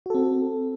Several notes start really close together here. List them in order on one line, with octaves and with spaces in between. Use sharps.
F#4 A4 C4